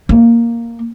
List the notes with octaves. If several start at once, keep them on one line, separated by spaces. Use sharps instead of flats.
A#3